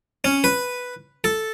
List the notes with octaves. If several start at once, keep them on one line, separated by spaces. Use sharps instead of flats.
C#4
B4
A4